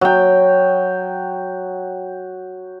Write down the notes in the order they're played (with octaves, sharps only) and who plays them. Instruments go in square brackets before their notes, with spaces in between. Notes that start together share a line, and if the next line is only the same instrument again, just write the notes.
[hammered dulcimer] F#3 G5